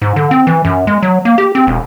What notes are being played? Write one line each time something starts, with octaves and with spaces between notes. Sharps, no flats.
G#2
D3
C4
E3
F#2
G#3
F#3
A#3
G4
C4
E1